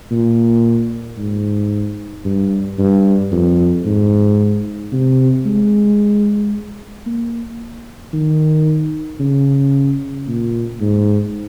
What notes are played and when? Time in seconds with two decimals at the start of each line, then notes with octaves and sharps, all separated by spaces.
0.11 A#2
1.18 G#2
2.25 G2
2.79 G2
3.32 F2
3.85 G#2
4.93 C3
5.46 G#3
7.06 A#3
8.13 D#3
9.20 C#3
10.28 A#2
10.81 G#2